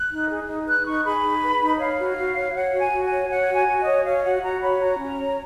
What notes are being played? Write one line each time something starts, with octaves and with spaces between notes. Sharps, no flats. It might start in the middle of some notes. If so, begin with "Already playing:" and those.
Already playing: F#6
D#4
G#4
D#4
B4 F#6
D#4 C#6
G#4 B5
D#4
B4
D#4
C#5 F5
F#4
F#4
C#5
C#5 F#5
F#4
G#5
F#4
G#5
C#5
C#5 F#5
F#4
G#5
F#4
D#5
C#5
C#5 F5
F#4 F#5
F#4 A#5
C#5 B5
F#4 A#5
C#4
C#5